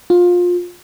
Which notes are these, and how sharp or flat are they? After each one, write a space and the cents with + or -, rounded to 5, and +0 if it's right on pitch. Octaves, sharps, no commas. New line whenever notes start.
F4 +20